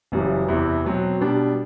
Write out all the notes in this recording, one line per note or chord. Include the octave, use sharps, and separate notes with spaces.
F#1 F#2 E3 G3
E2 C3 E3
B2 F#3 C4
B2 G3 D4